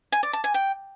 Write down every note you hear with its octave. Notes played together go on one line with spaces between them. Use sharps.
G#5
D5
A5
G#5
G5